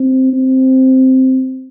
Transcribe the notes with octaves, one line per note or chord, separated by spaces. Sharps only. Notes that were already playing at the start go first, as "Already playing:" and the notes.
Already playing: C4
C4